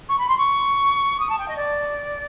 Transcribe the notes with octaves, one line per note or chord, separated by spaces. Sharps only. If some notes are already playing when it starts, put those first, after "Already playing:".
C#6
B5
C6
C#6
D#6
A5
G5
D#5
D5